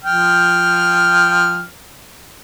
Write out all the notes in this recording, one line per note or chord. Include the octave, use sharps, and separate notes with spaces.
F3 G5 F6